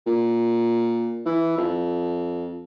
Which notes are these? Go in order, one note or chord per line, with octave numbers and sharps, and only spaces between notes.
A#2
E3
F2